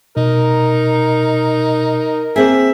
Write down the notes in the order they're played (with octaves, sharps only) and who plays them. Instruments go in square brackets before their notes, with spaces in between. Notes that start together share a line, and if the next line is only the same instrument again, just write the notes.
[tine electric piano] B2 [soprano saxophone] D#4 [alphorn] A#4
[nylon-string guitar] A#3 C4 G#4 [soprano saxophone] E5